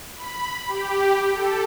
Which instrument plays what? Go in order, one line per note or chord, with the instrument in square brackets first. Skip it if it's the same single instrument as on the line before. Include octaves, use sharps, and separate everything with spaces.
[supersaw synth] B5
G4
A4